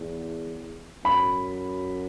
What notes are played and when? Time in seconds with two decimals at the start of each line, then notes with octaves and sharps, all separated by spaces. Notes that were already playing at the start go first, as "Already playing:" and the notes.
Already playing: E2
1.04 F#2 B5